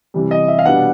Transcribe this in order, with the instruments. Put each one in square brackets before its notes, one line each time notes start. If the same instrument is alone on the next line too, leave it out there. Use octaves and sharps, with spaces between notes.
[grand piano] C3 E3 G3
D#5
E5
F5
B2 G3 B3 D4 F#5